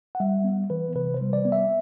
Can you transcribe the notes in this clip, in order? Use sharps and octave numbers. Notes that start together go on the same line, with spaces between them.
F#5
G3 E5
B3
E3 B4
C3 B4
C5
G3
D5
B3
E5